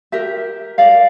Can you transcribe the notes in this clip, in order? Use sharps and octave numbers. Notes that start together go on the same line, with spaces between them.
G4 A#4 E5
A#4 D5 F5